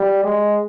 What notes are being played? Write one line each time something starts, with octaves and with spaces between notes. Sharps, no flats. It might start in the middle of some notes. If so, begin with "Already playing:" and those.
Already playing: G3
G#3